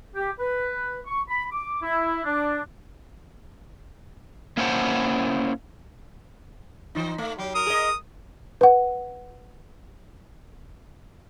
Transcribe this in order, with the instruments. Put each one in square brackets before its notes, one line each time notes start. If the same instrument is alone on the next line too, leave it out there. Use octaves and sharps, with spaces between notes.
[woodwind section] G4
B4
C#6
B5
D6
E4
D4
[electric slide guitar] A#3 C#4 E4 C5 F#5 A5
[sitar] E3 D#4
A3
[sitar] F#3 [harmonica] G4
[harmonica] A#4 D#6
[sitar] G#4 D#5
[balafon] B4 F#5